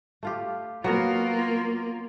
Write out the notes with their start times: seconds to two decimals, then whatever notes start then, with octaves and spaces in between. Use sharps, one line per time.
0.23 A3 F4 G4
0.84 F#3 A#3 B3 F4 A#4